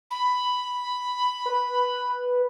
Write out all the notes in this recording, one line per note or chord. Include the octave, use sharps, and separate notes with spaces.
B5
B4